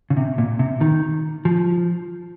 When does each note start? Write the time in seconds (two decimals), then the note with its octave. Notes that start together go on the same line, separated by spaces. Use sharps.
0.10 C#3
0.17 C3
0.38 A#2
0.59 C3
0.81 D#3
1.45 F3